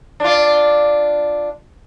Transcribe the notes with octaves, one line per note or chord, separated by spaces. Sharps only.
D4 F4